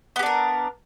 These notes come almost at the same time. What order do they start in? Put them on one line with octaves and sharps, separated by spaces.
B3 G4 D4 A#4